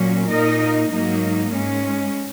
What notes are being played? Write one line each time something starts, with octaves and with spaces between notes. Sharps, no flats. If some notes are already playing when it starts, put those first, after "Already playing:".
Already playing: A#2 F#3 A#3 C#4
A#2 A#3 D#4 A#4 D#5
G#2 F#3 A#3 D#4
G#2 G#3 C#4